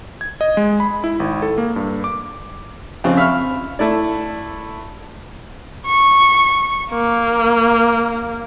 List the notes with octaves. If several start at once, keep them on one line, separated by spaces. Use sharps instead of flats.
G#6
D#5
G#3
B5
E4
G#1
A4
A#3
G2
D6
F2 C#3 C4
E5 F5 B5 C#6 F6
A3 E4 D5
C#6
A#3